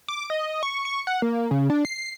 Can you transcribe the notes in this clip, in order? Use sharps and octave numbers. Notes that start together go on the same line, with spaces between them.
D6
D#5
C#6
C#6
F#5
A#3
C#3
D4
C7